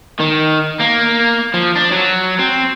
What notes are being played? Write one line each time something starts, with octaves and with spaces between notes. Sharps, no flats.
D#3
A#3
F3
D4
F#3
C4